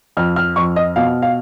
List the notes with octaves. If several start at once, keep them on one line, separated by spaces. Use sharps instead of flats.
F2 F6
F6
F2 C#6
D#5
B2 F5
F5